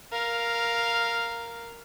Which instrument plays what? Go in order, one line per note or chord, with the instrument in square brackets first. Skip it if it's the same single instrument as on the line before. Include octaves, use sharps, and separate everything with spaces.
[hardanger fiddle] A#4 F5